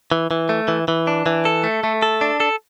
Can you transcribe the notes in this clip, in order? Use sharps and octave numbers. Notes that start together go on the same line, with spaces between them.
E3
E3
A3
E3
E3
D4
E3
A4
A3
A3
A4
D4
A4